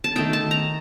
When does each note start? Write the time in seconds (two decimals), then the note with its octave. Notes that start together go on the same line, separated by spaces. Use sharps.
0.04 A5
0.15 D#3 A3 D#4 G5
0.33 A5
0.51 A#5